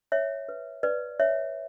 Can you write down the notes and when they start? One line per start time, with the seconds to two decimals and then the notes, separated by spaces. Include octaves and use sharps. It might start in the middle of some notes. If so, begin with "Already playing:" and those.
0.12 C#5 E5
0.49 B4
0.83 B4 D5
1.20 C#5 E5